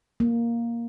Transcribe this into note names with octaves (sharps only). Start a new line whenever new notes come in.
A#3